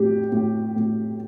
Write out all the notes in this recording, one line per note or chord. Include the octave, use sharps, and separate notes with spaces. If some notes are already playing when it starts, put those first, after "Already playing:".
Already playing: A2 G4
A2
A2